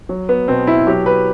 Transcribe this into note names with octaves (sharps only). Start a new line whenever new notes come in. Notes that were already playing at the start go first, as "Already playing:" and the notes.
F#3
B3
B2 C4
E4
F#3 G4
B4